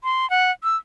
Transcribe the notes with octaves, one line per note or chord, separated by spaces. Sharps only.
C6
F#5
E6